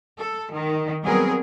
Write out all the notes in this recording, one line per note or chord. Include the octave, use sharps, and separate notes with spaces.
A4
D#3
F#3 G3 B3 C4 G#4 A#4